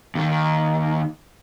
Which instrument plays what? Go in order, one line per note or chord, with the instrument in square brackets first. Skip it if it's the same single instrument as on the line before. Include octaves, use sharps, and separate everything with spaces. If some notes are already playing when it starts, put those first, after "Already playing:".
[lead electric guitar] D#2 D#3